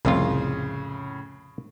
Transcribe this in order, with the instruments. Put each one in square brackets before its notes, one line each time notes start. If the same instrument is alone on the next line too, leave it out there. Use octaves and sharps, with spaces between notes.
[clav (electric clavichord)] C2 F2 F4 [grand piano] A2 C#3